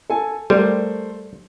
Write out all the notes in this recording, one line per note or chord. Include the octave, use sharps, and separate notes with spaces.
A4 G#5
G3 A3 A#4 C5